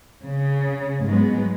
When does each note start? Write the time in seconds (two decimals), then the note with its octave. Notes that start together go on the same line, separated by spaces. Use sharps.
0.24 C#3
1.04 G#2 F#3 G#3 B3